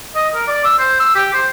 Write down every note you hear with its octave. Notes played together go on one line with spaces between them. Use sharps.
D#5
A#4
D5
E6
C5
E6
G4
C5